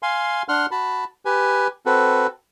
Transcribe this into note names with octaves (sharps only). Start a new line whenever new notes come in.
F5 G#5 C6
D4 F#5 C6 F6
F#4 A5 B5
G4 B4 G#5
C4 F#4 A4 B4